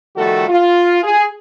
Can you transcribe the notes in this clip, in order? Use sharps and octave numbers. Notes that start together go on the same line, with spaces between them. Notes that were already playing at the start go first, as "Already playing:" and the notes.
D#3 F3 G3 A3 F#4 A4
F4
G#4